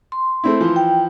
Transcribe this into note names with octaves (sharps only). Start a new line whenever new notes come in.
C6
A3 C4 E4
E3 F3
G5